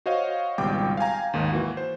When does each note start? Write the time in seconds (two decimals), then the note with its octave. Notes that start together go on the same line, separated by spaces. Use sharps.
0.06 F#4 C5 C#5 D#5 F5
0.58 G#1 C#2 B2 G3 G5 D6
0.97 F5 G5 G#5 A#5
1.34 D#2 G#2 D#3
1.52 E3 A#3 F#4
1.77 C5